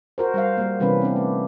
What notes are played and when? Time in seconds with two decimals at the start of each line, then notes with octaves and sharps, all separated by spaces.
0.18 F#4 A#4 C5
0.34 G3 C5 F5
0.57 G3 A#3
0.80 C3 E3 G3 B3 C#4 B4
1.02 C4 D4
1.16 A3